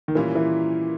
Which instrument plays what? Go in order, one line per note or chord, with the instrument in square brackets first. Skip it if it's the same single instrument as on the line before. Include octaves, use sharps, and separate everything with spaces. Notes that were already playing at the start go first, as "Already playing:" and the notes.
[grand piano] D#3
[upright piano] A#2 G3 A#3 C#4 E4 [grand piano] E3
[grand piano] E3